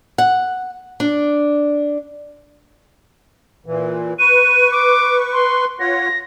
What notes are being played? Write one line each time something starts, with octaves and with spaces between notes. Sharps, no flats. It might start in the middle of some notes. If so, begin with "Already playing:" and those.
F#5
D4
A#2 E3
B4 C#6 D#7
D6
C6
F4 C#5 F#5 A#6